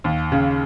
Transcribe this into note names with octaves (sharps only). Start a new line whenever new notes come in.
D#2
C#3